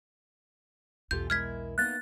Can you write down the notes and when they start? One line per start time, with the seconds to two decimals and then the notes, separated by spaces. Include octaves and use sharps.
1.11 B1 E2 F4 G4 A4 G6
1.30 G#3 E4 A#4 F6 G#6 B6
1.78 A#3 B3 D#4 F#6 A6